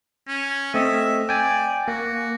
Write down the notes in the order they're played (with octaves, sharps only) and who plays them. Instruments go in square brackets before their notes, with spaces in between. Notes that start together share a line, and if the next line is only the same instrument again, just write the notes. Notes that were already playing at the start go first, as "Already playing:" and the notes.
[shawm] C#4
[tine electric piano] A3 C4 D#5 [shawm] E5
[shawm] D5 [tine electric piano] G5 G#5
[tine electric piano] A#3 [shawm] F#4